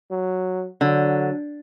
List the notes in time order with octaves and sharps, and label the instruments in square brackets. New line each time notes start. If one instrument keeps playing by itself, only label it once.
[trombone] F#3
[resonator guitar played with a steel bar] D3 [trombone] F#3